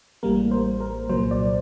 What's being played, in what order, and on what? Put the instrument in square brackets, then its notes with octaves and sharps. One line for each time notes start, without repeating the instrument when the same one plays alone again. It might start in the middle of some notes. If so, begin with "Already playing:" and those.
[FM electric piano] A1 A2 G3 A#3 A#4
C5
A#4
C2 A#2 F#3 C5
D5